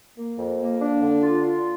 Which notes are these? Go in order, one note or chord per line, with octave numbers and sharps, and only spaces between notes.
A#3
F2
A#3
D4
D3
F4
F4